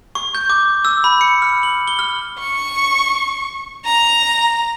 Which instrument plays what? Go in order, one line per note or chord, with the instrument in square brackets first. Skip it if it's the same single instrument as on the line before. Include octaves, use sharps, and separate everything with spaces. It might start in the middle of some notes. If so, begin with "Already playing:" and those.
[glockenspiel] C#6
G6
D6
E6
B5
C#7
F6
F#7
G7
F6
[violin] C#6
A#5